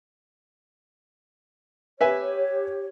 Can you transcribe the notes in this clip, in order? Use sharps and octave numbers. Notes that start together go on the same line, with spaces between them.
G4 B4 C#5 E5 G#5